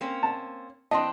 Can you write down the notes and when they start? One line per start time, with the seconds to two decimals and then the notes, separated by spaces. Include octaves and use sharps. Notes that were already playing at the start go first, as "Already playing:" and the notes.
0.01 A#3 C4 C#4
0.23 A5
0.91 E3 C4 D4 D#5 A5 C6